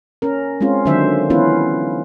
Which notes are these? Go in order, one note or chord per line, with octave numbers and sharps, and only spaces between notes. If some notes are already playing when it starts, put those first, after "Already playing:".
C#4 A#4
G#3 C4 C#4 F4
D3 D#3 F#3 D4 C5 E5
E3 B3 C#4 E4 F4 B4